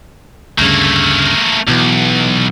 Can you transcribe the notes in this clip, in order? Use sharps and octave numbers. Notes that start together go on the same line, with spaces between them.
D2 G2 C#3 A3 A#3
B1 B2 E3